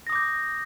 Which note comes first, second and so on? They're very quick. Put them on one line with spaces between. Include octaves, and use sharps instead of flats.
A#6 D#6 D6 G6